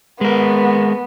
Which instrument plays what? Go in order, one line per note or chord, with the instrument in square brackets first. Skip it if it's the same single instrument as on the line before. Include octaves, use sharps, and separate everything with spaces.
[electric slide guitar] G#3 A#4 [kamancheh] B3